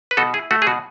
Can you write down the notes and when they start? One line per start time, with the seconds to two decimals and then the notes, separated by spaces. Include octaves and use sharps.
0.11 B4
0.17 B2 F#4 A4
0.34 E4 G#4
0.51 A3 F#4
0.62 G#4
0.67 B2 F#4